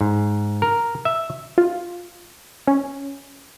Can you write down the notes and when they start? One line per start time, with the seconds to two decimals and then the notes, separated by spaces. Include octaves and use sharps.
0.01 G#2
0.62 A#4
1.05 E5
1.58 F4
2.67 C#4